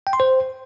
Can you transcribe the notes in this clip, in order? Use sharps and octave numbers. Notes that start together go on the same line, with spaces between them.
G5
C6
C5